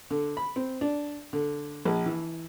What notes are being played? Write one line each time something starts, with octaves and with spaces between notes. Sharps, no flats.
D3
B5
C4
D4
D3
A#1
E3